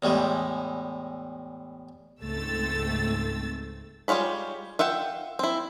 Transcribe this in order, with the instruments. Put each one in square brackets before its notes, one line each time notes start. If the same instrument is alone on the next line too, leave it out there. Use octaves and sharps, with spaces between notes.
[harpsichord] E2 A2 G3 G#3
[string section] C#2 G#2 A3 C4 E6 A6
[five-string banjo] G3 G#3 F4 C#5 B5
F4 E5 F#5 G5
C4 E4